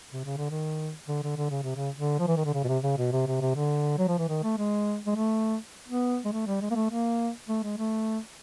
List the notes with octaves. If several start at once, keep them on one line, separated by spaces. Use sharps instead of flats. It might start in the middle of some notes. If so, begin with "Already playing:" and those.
C3
C#3
D3
D#3
D3
D3
D3
C#3
C3
C#3
D3
F3
E3
D#3
D3
C#3
B2
C3
C#3
B2
C3
C3
C3
D3
F#3
F3
E3
D#3
A3
G#3
G#3
A3
B3
G#3
A3
G3
G#3
A#3
A3
A#3
A3
G#3
A3